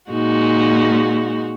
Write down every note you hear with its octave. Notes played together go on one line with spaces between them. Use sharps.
A#2 G#3 D#4 F#4